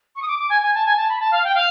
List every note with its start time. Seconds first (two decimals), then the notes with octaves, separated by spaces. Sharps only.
0.16 C#6
0.22 D#6
0.28 D6
0.38 D6
0.50 G#5
0.62 G#5
0.74 A5
0.85 G#5
0.97 A5
1.09 B5
1.20 A5
1.31 F5
1.44 G5
1.55 F5